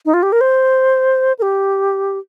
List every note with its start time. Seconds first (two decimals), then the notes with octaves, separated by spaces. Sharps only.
0.05 D#4
0.14 F4
0.23 G4
0.32 A#4
0.41 C5
1.39 A#4
1.42 G4